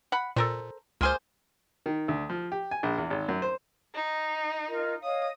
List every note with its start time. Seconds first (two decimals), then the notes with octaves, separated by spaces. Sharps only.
0.12 F#5 B5
0.36 A#2 A4 A#4 C5
1.01 C#2 A#3 G#4 C5 C6 F6
1.86 D#3
2.08 D2
2.30 F3
2.52 G4
2.71 G#5
2.83 A#1
2.98 E2
3.10 G#1
3.28 F#2
3.42 C5
3.94 D#4
4.68 F4 A#4 D#5
5.04 C#5 D#5 F5 D#6